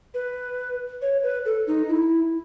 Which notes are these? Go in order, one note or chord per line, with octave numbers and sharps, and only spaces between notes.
B4
C#5
B4
A4
D#4
E4